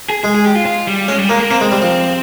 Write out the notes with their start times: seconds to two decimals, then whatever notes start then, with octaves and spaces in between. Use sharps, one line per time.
0.10 G#4
0.23 G#3 G#4
0.34 G#4
0.45 G4
0.55 F4
0.66 F4
0.87 G3
1.08 G#3 C#4
1.18 G3
1.29 G#3 A#3
1.40 A#3
1.50 A#3 C4
1.61 G#3
1.72 G3
1.82 F3